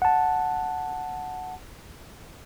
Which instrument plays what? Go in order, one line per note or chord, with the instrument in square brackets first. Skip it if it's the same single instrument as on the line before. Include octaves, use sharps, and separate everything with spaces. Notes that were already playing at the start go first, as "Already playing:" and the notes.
[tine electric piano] F#5 A5